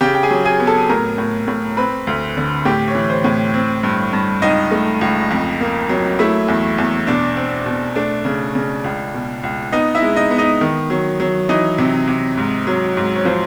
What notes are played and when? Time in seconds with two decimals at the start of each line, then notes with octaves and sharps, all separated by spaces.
0.01 C#3 G4 G5
0.15 G5
0.23 G#4 G#5
0.31 F#3
0.45 G#4 G#5
0.60 B3
0.67 A4 A5
0.89 A2 A#4 A#5
1.18 A2
1.48 A2
1.77 C4 B4 B5
2.07 D2
2.37 D3
2.65 A2 G4 G5
2.88 C#5
2.95 E3
3.10 C5
3.24 A2
3.54 C4
3.83 G2
4.13 G2
4.42 C#2 D#4 D#5
4.71 A3
5.01 C#2
5.31 F2
5.61 A#3
5.89 F#3
6.19 A3 E4 E5
6.48 E2
6.78 E2
7.07 B2 D4 D5
7.37 C4
7.66 B2
7.96 A3 D4 D5
8.25 C#3
8.55 C#3
8.84 C#2
9.14 B2
9.43 C#2
9.73 B3 D#4 D#5
9.95 E4 E5
10.02 G#3
10.16 D#4 D#5
10.31 B3
10.38 D#4 D#5
10.61 D#3
10.90 F#3
11.20 F#3
11.49 E3 D#4 D#5
11.78 C3
12.08 C3
12.37 G#2
12.67 F#3
12.97 G#2
13.16 C#5
13.25 F3 C5